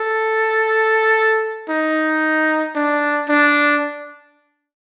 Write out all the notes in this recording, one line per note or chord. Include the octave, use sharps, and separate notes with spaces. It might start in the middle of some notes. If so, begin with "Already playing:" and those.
Already playing: A4
D#4
D4
D4